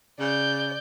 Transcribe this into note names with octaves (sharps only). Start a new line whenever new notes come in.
C#3 D5 G6